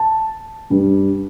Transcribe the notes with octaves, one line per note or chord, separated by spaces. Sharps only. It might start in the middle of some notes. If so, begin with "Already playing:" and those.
Already playing: A5
G2 G3 D4